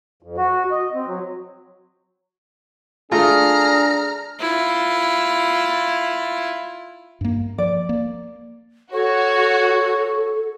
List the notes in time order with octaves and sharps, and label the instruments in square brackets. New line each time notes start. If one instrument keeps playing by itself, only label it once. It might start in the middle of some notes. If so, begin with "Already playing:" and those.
[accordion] F2
F#4
D#5
C4
F#3
[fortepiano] A3 F4 [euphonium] D4 [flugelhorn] G#4 [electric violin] A#5 F6
[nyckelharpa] E4 F4
[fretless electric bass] G2 A#3
[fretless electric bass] F3 [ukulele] D5
[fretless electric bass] A#3
[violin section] F#4 [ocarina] A4 [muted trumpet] C#5